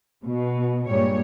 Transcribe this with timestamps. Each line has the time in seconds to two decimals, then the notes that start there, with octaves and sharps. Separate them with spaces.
0.24 B2
0.88 G2 A#2 G3 G#3 C#5